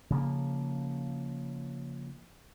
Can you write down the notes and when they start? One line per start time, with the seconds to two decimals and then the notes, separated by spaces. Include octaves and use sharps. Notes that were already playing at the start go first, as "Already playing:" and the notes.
0.10 C#3 F3 A#3